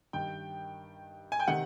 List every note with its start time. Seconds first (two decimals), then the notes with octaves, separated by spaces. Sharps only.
0.13 G2 D#3 G5
1.32 G#5
1.40 G5
1.47 C3 D#3 F#5